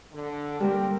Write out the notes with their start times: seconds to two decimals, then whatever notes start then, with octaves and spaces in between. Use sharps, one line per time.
0.13 D3
0.60 G3 A#3 C4 G4 A#4